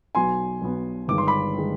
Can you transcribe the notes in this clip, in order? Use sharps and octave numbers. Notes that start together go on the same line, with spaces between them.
B1 B2 B3 G#5 C6
B1 B2 B3
G1 G2 D#3 G#3 D6
C6
B5 D6
D#3 G#3